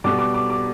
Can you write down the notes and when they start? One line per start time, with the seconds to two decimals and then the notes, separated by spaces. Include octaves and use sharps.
0.04 B2 G3 B3 D6
0.19 D6
0.34 D6
0.50 D6